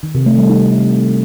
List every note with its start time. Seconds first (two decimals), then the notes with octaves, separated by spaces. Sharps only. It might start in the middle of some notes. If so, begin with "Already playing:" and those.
0.03 D#3
0.15 C3
0.26 A3
0.38 G3
0.50 D#4